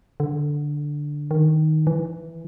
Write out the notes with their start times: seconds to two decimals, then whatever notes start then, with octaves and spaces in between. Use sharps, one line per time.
0.20 D3
1.31 D#3
1.87 E3